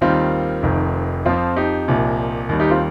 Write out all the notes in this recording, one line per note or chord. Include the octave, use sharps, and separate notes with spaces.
D#2 D#3 G3 C4 F4
F1 F2 D#3
F2 F3 C4 F4
D#4 G4
C2 A#2 F3
D#2 D#3 G3
D#4 G4
C4 F4